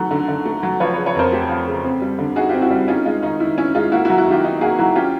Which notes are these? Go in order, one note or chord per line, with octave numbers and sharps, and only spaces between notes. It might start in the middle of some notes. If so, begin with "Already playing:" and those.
Already playing: D#3 F#3 A3
D3
D3
A3
F#3
F3 B4 C#5
C#3 B4 C#5
B4 C#5
F2 A#4 C5
A3 G4 A4
F3
C#3
C4
G3
D3
D#4 F#4 G#4
C4 F4 G4
E4 F#4
G3
C#4 D#4 F4
G#3 D#4 F4
D#3 D#4
D#3 E4
C#4 E4
G#3 D#4 F4
A#3 E4 F#4
E4 F#4
F#3
E4 F#4
D#3 F4 G4
D#4
A#3 F#4 G#4
F#3 E4 F#4
C#4 F4 G4